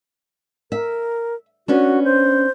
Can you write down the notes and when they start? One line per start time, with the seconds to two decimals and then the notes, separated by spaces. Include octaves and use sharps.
0.72 A#4 E5
1.68 B3 C#4 D4 F#4
2.04 C5